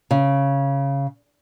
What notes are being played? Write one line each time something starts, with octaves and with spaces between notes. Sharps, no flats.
C#3